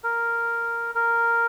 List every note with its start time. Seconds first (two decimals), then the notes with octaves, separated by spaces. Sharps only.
0.04 A#4
0.95 A#4